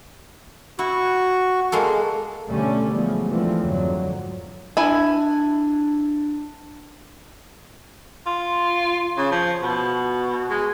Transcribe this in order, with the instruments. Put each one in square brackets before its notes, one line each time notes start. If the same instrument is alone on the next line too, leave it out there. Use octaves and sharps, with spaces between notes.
[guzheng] E4 [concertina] F#4 C#6
[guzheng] G#3 A#3 A4
[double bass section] B2 D3 G3 A3 C#4
B2 F3 F#3 G#3 B3
D3 E3 F3 A3 C4
F2 G#2 D3 F#3
[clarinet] D4 [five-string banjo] E4 G#5
[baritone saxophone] F4
C#3
F3
B2
G#3